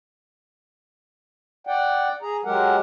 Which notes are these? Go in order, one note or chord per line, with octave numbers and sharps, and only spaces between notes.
D5 F#5 G5
G#4 A#5
F#3 G#3 G4 A#4 F#5